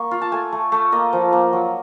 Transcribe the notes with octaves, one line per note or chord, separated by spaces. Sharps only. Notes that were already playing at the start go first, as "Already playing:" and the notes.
Already playing: A#3 C#6
F4
A5
A3 G#5
A3
A3
A#3 D#5
F3
A#3
F#3